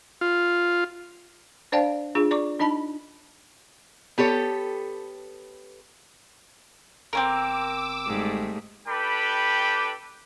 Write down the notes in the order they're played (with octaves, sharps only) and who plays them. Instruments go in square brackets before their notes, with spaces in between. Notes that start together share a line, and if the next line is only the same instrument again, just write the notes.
[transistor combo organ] F4
[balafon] D4 C5 D5 F5 G5 A5
D4 F4 G#4
D5 A#5 C#6 D6
D4 D#4 D#5 A5 B5
[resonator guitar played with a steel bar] B3 G4 A4 C#5
[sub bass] G1 [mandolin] C4 C#4 A#4 [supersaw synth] D6 E6
[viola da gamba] G#2 G3 A3
[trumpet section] D4 G4 A4 B4 G5 B5